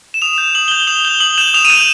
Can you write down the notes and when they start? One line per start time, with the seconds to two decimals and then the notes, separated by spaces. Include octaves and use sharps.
0.14 E7
0.22 D#6 F7
0.38 G6
0.55 D#6 F#7
0.68 G7
0.71 G6 F#7
0.87 D#6 F7
1.05 G6 G7
1.20 D#6 F#7
1.38 G6 E7
1.54 D#6 F7
1.65 D#7
1.70 G6 E7